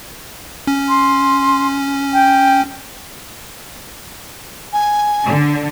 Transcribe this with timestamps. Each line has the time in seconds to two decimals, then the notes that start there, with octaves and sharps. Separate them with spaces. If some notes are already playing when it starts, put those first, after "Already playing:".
0.67 C#4
0.89 C6
2.13 G5
4.73 G#5
5.25 D3